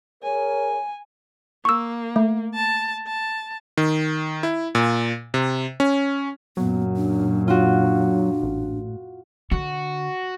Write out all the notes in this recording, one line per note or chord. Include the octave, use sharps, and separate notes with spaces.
G#4 A#4 C#5 G#5
A#3 C#6 E6
A3
A5
A5
D#3
E4
A#2
C3
C#4
F#2 A#2 F#3 B3
D4
D4 F4 F#4
A1
D3 F#4